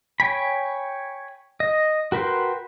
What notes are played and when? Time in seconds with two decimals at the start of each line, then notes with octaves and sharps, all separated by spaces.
0.20 C#5 G5 G#5 B5
1.60 D#5
2.12 F#4 A#4 B4 G5 C6